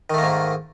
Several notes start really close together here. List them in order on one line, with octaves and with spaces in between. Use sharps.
D#3 A3 A#3 G#2